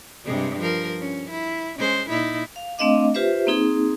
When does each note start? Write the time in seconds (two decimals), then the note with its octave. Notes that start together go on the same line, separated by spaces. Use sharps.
0.24 G2 C3 G#3
0.61 F3 A#4
1.00 C#4
1.30 E4
1.78 G#3 C#4 C5
2.09 A#2 D#4 E4
2.56 F5
2.78 A3 C4 D4 D#5 F5 D6
3.14 F4 G4 B4 C5 E5
3.47 A#3 C4 D#4 G#4